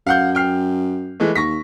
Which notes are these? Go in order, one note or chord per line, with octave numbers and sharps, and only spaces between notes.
F#2 F5 F#5 G6
G5 F6 C7
E3 G#3 A3
D#2 C#6 A#6 B6